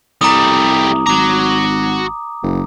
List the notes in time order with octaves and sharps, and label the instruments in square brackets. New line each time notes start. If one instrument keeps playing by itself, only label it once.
[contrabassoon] C2 [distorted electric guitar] G3 A3 [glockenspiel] A#5 D6 D#6
[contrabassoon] G#1 [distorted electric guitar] F#4 A#5 [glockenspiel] D6
[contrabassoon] F#1